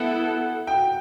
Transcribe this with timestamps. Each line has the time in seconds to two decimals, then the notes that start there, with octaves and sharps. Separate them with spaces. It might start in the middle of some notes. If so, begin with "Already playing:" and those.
Already playing: B3 E4 A4 F#5
0.67 G5